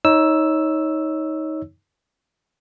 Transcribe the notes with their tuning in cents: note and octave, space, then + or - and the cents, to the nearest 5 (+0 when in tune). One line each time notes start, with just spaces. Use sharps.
D#4 +20 C#5 +0 E6 +0